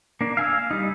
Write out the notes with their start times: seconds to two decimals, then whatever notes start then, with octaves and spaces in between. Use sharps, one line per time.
0.21 A#3 D4
0.37 F5 G#5 E6
0.71 G3 D#4